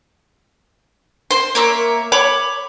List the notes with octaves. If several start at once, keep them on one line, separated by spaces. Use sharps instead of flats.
C5 C6
A#3 C#5 E5
C#5 B5 D6